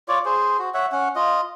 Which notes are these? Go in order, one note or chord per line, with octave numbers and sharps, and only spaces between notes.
F4 C#5 D5
G#4 C5
F#4
C#5 E5 F#5
C#4 F#5
F4 D#5